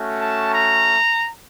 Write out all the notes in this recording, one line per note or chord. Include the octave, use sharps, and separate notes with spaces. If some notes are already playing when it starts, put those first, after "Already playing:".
Already playing: A3 C#4 F#4
A5
A#5